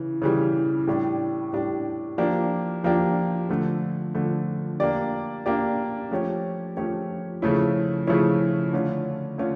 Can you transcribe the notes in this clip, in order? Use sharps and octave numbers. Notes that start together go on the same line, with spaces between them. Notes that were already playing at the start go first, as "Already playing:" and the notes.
Already playing: C#3 E3
C#3 E3 G3
A2 G3 D4 G4
A2 G3 D4 G4
F3 A#3 D4 G4
F3 A#3 D4 G4
D3 F3 A3
D3 F3 A3
A#3 D4 G4 D5
A#3 D4 G4 D5
F3 A3 C#4 G4 C#5
F3 A3 C#4 G4 C#5
C#3 F3 A3 C#4 E4
C#3 F3 A3 C#4 E4
D3 A3 C#4 F4
D3 A3 C#4 F4